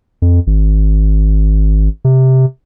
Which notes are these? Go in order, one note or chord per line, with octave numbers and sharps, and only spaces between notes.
F2
G#1
C3